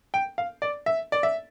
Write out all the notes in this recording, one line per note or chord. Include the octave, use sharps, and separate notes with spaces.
G5
F5
D5
E5
D5
E5